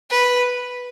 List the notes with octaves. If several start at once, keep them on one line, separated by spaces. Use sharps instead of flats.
B4